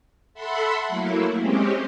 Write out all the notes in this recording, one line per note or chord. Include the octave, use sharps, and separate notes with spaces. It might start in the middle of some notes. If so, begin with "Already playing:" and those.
A4 E5 F#5 B5 C6
F#3 A3 A#3 E4
G#3 C4 C#4 G4